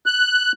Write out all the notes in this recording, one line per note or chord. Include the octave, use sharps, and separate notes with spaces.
F#6